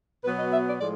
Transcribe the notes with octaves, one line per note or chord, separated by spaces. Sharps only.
B2 F#3 B3 B4
D#5
E5
D5
A2 F3 G#3 D5